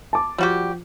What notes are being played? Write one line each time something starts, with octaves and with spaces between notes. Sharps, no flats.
A5 D6
F3 G3 F#4 G4